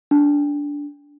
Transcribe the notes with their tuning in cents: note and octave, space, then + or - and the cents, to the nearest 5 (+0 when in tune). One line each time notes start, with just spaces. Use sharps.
D4 -15